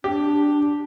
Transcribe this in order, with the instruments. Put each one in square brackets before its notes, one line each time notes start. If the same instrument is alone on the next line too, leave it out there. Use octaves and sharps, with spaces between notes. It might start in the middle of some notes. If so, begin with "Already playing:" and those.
[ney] D4 [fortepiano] G4